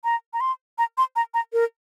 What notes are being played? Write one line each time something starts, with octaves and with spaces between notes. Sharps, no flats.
A#5
A#5
C6
A#5
C6
A#5
A#5
A#4